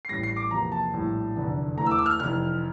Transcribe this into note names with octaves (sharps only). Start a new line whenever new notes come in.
C7
A1 A2 G3 A#6
C7
D6
E2 C3 F3 A#3 A#5
A5
A#1 A2 G3
F1 E2 D3
E2 E3 A3 A#5
E6
D6
E6
F6
F1 F2 E3 F6